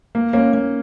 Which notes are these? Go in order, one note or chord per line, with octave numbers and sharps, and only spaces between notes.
A#3
A#3 C#4
A#3